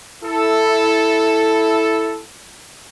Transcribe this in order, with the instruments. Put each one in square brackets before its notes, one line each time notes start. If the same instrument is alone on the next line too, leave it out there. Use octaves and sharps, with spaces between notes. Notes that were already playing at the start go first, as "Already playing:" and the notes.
[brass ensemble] E4 A4